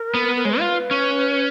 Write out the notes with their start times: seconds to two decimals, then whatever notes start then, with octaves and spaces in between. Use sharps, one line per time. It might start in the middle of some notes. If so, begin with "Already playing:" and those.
Already playing: A#4
0.14 B3
0.36 A#4
0.45 G#3 C#5
0.50 B4
0.59 F4
0.91 C#4